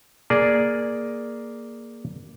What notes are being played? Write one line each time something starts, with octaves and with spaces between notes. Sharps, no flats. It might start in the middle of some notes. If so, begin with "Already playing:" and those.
A#3 G#4 D5